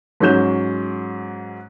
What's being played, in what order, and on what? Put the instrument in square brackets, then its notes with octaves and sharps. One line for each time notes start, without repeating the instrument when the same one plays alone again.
[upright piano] G#2 F#3 C#4 G6 E7